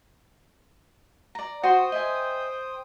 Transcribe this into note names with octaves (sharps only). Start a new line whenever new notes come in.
D5 A#5
F#4 C5 G5 C6 D#6
D#5 E5 G#5